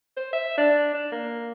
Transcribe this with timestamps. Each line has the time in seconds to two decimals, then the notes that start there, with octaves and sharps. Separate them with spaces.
0.17 C5
0.33 E5
0.58 D4
0.94 D4
1.12 A#3